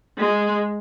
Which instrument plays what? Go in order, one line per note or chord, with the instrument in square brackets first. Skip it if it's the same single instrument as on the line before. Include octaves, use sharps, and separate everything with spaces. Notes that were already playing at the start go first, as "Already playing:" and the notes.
[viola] G#3